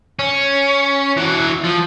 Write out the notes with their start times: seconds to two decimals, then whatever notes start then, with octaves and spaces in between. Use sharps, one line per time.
0.19 C#4
1.17 E3 F#4
1.64 F3